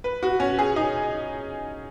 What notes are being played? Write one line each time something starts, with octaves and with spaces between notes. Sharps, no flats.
B4
F#4
C#4
G#4
D#4